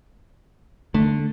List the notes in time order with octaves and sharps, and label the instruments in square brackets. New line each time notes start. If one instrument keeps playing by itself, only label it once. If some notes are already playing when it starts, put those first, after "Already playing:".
[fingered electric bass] D3 [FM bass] A3